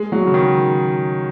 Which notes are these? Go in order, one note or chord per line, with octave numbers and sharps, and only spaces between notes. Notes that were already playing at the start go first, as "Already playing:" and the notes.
Already playing: G#3
F#3
C#3
D#3